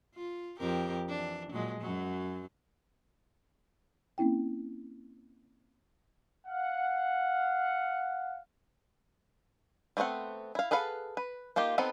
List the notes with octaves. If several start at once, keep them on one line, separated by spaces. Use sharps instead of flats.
F4
F2 G4 A#4
E3 D4
A#2 F#3 G#3
F#2 F#3
A#3 C4 C#4 E4 G5
F5 F#5
G3 A3 B3 C4 F#5
E4 F5
G#4 A4 B4 F5 F#5
B4
A#3 D#4 F4 G4
B3 C4 D#4 A4 B4